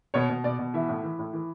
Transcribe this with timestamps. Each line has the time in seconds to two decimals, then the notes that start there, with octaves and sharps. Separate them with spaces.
0.14 B2 C#5
0.29 B2
0.44 B2 D5
0.59 B2
0.74 E3 E5
0.88 A2
1.03 E3
1.19 A2
1.33 E3